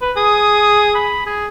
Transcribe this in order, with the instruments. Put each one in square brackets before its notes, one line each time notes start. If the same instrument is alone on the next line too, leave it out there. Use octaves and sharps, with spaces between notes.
[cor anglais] B4
[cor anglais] G#4 [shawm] D#6
[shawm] B5
G#4